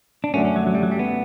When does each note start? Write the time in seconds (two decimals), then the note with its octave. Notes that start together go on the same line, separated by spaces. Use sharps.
0.24 D4
0.34 F#2 D3 A3 C#4 D4 F#4
0.45 C#4
0.56 F#3
0.67 F#3
0.75 G3
0.83 F#3
0.91 G3
0.99 B3